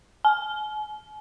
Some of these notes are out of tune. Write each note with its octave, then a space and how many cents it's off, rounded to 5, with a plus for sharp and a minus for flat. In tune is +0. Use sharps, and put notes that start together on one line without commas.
G#5 +40